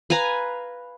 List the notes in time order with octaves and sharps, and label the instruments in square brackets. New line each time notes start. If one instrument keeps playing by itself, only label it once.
[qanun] B4 F5 G#5 A#5